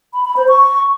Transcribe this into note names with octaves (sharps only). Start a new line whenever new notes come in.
B5
B5
C5
C#6